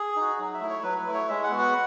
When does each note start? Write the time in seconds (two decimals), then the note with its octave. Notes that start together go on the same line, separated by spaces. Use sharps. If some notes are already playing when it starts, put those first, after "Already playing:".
Already playing: G#4
0.16 D#4 F#4
0.39 F#3
0.54 E5
0.61 A3 E4
0.69 C#5
0.83 F#3 B4
0.98 B4
1.07 A3 E4
1.14 C#5
1.29 G#3 E5
1.43 F#5
1.51 B3 F#4
1.59 F#5